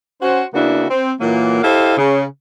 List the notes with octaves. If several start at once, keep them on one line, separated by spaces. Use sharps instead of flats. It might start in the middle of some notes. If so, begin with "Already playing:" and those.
C#4 F#4 C5
C#3 A#3 B3 D4 E4 F#4
C4
A#2 E3 F#3 A#3
E4 G4 A4 C5 D#5 F5
C#3